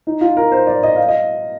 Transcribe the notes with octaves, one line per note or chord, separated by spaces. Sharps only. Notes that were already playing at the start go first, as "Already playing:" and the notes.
D#4
F4
A#4
C5
D5
D#5
F5
D#5